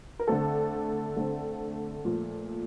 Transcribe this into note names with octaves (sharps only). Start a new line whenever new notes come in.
A#4
D3 A3 C4 A4
D3 A3 C4
A#2 F3 A3